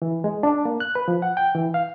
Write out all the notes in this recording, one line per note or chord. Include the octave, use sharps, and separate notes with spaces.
E3
G#3
D4
A#3
F#6
B4
F3
F#5
G5
E3
F5